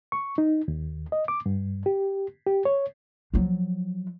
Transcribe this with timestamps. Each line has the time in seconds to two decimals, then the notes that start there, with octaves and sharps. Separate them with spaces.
0.12 C#6
0.38 D#4
0.68 D#2
1.12 D#5
1.28 D6
1.46 G2
1.86 G4
2.47 G4
2.65 C#5
3.34 F3 F#3